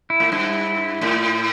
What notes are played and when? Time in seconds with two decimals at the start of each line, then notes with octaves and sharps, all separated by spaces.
0.10 E4
0.20 A2
0.32 G2 E4
1.01 A2